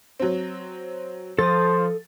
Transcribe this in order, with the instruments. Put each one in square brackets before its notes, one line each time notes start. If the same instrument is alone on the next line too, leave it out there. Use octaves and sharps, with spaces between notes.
[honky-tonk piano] F#3 C4
[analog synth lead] F3 [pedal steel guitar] A4 D#6 [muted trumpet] C5 [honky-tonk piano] A6